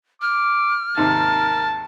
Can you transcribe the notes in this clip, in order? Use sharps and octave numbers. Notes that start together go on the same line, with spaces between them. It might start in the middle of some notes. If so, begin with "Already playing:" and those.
D6 F6
D#2 G#2 C3 A#4 A5